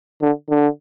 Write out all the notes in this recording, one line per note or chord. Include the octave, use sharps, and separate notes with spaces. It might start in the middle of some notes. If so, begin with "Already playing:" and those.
D3
D3